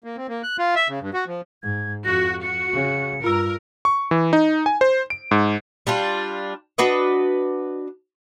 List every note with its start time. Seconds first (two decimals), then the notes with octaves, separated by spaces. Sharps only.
0.04 A#3
0.17 C4
0.28 A#3
0.43 F#6
0.58 F4
0.75 E5
0.89 C#3
1.01 G2
1.14 F#4
1.27 F3
1.63 G#2 G#6
2.05 F2 F#4 A#6
2.43 F#4 C#7
2.73 C#3
3.24 G2 F4 A#4 E6
3.85 C#6
4.11 E3
4.33 D#4
4.66 G#5
4.81 C5
5.10 D7
5.31 G#2
5.87 G3 D4 F4
6.78 D4 F#4 B4 D#5